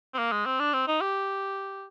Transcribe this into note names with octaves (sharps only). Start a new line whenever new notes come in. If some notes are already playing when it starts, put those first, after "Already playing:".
C4
A#3
G#3
C4
D4
C4
D#4
G4